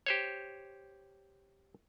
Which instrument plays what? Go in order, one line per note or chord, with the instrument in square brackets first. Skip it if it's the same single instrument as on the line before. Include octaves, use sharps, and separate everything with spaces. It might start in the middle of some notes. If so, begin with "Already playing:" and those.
[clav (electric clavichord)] G4 C5 C#5